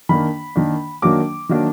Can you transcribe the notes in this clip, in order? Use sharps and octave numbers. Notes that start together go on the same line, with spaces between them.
D#3 A#3 D4 B5
D#3 A#3 D4
D#3 F#3 A#3 D4 D6
D#3 F#3 A#3 D4